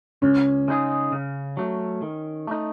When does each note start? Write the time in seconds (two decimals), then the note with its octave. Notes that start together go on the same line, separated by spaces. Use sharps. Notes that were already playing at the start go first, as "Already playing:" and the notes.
0.22 C#2 C#4
0.68 C#3 G#3 D#4 G#4
1.12 C#3
1.57 F#3 A3
2.02 D#3
2.47 A3 D#4